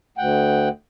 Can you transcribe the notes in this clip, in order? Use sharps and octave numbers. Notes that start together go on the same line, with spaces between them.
D2 F#5 G5